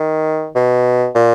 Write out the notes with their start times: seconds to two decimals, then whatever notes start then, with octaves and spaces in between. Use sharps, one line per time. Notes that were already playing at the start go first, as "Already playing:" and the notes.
Already playing: D#3
0.55 B2
1.15 A#2